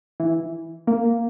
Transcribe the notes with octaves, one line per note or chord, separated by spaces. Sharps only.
E3
A#3